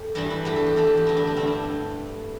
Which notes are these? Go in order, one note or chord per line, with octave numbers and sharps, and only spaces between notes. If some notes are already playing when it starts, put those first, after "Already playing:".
Already playing: A3 G4 A4
G2 E3 G3 D4
E4
E2 E3 A3 G4
A4
G4
E2 E3 A3 A4
G4
G4
G2 D3 A3 E4
D4
D4
G2 D3 A3 C4
D4